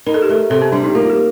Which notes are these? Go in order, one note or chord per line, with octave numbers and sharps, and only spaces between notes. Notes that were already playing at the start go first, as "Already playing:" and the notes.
D#4 A#4
A4
G4
A3 A4
C3 A4
C4
G3 D4
D#4
A#3 F4
G4